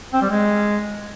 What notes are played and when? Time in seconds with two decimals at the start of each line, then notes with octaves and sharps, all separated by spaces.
0.13 C4
0.22 G3
0.30 G#3